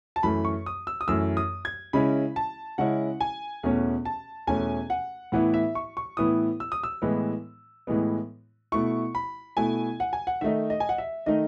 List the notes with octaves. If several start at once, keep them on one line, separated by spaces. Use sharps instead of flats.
A5
F#2 E3 A3 B5
C#6
D#6
E6
D#6
F#2 E3 A3 E6
D#6
G#6
C#3 G#3 C#4 E4 B5
A5
C#3 G#3 C#4 E4 F#5
G#5
E2 B2 A3 C#4
A5
E2 B2 A3 C#4 G#5
F#5
A2 E3 B3 E4 F#5
E5
C#6
C#6
A2 E3 B3 E4 D#6
E6
D#6
E6
A2 E3 G#3 B3
A2 E3 G#3 B3
B2 A3 E4 C#6
B5
B2 A3 E4 G#5
F#5
G#5
F#5
D#3 A3 D#4 E5
D#5
G#5
F#5
E5
D#3 A3 D#4 D#5